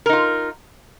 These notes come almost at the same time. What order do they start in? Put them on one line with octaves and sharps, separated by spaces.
A#4 D#4 F4